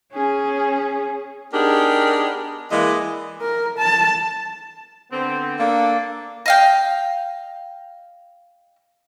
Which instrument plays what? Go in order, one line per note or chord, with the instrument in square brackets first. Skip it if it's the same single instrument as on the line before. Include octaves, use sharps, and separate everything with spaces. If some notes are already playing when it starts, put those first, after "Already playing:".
[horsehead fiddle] C#4 G#4
[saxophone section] B3 D4 D#4 G4 G#4 A#4
E3 G#3 A#3 D5 D#5
[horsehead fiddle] A#4
A5
[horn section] D3 B3 C4
[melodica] A#3 [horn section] D4 A4
[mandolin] D#5 F5 G5